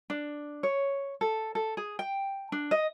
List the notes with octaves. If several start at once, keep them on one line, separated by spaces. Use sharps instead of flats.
D4
C#5
A4
A4
G#4
G5
D4
D#5